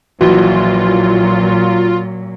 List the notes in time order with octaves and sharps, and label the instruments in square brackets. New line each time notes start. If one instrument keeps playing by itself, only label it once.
[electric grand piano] A#1 E3 [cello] A#2 F#3 [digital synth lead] F4 [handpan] F#4